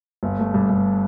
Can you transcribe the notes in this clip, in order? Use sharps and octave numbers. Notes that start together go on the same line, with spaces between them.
G1
A3
G2
G2